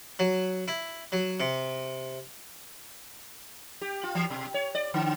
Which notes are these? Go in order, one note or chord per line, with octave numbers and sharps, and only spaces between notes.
F#3
E4
F#3
C3
G4
F4
E3
B2
C#5
D5
D3